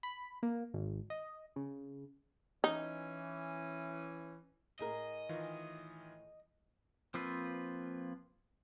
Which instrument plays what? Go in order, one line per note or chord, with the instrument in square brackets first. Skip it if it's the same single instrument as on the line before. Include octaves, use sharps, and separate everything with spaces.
[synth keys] B5
A#3
G#1
D#5
C#3
[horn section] E3 C#4 [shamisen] D#4
[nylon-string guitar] A2 G#4 A#4 [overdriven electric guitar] D#5
[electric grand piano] D#3 E3 F4
[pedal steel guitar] F3 A#3 C4 F4 B4